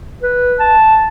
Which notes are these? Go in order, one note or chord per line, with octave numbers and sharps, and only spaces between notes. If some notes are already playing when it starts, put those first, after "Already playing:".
B4
A5